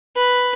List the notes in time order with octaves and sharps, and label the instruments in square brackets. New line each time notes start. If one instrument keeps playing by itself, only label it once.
[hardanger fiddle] B4